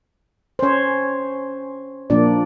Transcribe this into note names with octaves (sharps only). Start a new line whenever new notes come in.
C5
C#4 C#5
A#2 F3 A#3 D4 D5